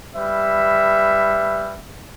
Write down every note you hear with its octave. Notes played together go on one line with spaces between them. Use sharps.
G3 B4 E5